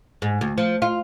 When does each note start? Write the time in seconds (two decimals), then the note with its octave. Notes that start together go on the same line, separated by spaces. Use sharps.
0.22 G#2
0.41 D2
0.58 F3
0.82 F4